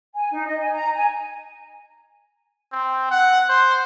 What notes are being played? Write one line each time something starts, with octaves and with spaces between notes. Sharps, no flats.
G#5
D#4
D#5
G#5
A#5
G#5
C4
F#5
C5